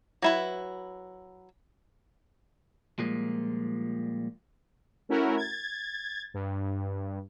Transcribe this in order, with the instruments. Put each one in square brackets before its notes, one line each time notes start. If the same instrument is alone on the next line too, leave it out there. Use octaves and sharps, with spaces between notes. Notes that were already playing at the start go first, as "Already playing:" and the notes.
[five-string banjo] F#3 E4 B4
[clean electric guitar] A#2 F3 G3 G#3 A#3
[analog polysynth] A3 C#4 E4 F#4 A#4
G#6 A6
G2